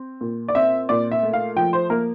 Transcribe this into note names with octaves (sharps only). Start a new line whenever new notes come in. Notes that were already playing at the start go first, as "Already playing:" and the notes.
Already playing: C4
A#2
D5
C4 E5
A#2 D5
E5
A3
F5
F3 G5
C5
A#3 A#4